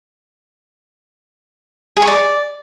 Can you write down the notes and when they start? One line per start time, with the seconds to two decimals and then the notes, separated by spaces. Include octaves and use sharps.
1.97 G#4
2.02 C#6
2.07 D5